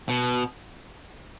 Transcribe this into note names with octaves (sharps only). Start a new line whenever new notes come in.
B2